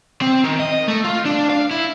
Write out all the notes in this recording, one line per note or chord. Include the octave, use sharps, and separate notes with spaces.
C4
D#3
D#5
A3
F4
D4
F5
E4